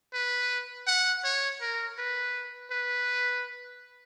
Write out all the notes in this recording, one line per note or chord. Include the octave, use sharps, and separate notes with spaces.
B4
F#5
C#5
A#4
B4
B4